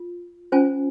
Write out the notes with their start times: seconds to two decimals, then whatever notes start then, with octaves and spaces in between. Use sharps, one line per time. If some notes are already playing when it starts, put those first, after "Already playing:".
Already playing: F4
0.52 C#4 F4 C5 G#5